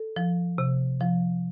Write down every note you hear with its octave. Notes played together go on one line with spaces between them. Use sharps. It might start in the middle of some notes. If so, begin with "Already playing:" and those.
Already playing: A4
F3
C3
F3